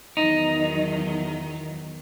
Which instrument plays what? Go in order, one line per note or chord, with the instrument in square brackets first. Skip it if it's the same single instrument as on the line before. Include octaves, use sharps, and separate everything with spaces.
[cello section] E2 D#3 F#3 [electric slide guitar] D#4